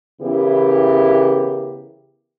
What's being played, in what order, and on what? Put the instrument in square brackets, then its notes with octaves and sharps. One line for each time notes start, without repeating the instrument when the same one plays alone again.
[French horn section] C#3 E3 B3 E4 G4 A#4